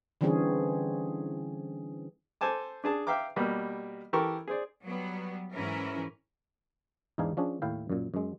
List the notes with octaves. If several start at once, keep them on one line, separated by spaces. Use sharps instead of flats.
D3 E3 G3 C4 C#4 G#4
A4 C5 G#5 A5 D6
D4 G#4 A5
E5 F5 G5 A#5 D6
B2 G3 A#3
E3 G4 A4 A#4 C#6
G#4 C5 D5
F#3 G3 B3
G#2 E3 C#4 E4 A#4
E2 G#2 D4 D#4 F5 G#5
F3 C#4 D4 G#4
D#2 A2 E4 F5 G5
F#2 A#2
F#2 G#3